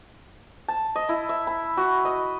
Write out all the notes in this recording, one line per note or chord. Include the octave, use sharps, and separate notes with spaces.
A5
D#5
E4
E5
B5
F#4
D#5